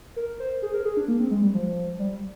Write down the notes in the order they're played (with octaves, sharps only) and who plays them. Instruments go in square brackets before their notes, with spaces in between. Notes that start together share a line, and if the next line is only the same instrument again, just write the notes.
[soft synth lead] A#4
C5
G#4
A#4
G#4
D4
A#3
C4
G#3
G3
F3
G3